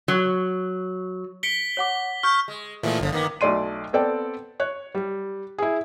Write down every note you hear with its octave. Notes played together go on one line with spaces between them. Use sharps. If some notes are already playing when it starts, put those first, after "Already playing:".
F#3
B6 C#7 D7 G7
C#5 F#5 D6
C#6 F6 G6
G#3
A#2 E3 F3 G#3 A3
G1 D3 D#3 F3
D#3 A#3 B3
B1 A3 D5 C6 D#7
B3 C4 A4 D5 G5
C#5 F#6
G3
E4 G#4